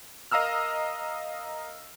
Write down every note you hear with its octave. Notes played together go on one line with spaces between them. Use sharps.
A#4 D#5 F5 A#5 E6 F6